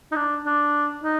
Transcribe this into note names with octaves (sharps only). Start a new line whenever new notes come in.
D#4
D4
D4
D#4